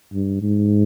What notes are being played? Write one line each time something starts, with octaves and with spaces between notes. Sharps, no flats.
G2
G#2